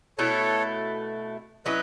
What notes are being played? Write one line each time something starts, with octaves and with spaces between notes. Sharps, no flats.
B2 A3 E4 A4 C#5
F#3 C#4 E4 B4 D#5